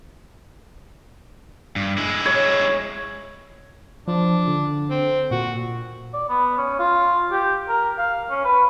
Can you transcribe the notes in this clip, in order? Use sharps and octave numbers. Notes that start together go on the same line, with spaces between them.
G2
G#3 E4
C#5
F3 D4
D3
C4
A#2 F#4
D5
B3
C#4
F4
G4
A#4
F5
C#4
B4